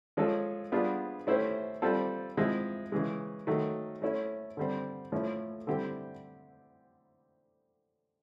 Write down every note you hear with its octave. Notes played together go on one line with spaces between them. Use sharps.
F3 G#3 C#4 F4 A4
G3 B3 D4 F4 G#4
A3 C#4 E4 G4 C5
G3 C4 F4 A4
F3 G#3 C4 E4
C#3 E3 G#3
D#3 F#3 A3
A3 C#4 E4
D3 G3 C4
A2 F3 A3 C#4 E4
D3 G3 C4 E4 G4